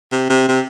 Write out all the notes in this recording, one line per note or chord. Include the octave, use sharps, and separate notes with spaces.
C3
C3
C3